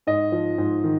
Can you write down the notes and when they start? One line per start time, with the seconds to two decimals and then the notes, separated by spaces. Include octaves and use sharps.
0.07 G#2 D#5
0.32 F3
0.58 G#2
0.84 D#3